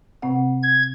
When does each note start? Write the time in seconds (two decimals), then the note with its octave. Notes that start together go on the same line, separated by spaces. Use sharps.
0.22 C3 C4 F#5
0.63 G#6